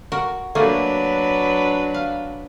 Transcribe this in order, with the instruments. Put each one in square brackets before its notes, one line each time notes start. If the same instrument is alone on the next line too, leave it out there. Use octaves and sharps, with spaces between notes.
[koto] F#4 A#4
[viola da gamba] F#3 D4 B4 [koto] A3 A#3 G#5
[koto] F5